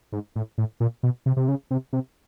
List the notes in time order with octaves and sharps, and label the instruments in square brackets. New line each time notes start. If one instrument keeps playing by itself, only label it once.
[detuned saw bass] G#2
A2
A2
A#2
B2
C3
C3
C#3
C3
C3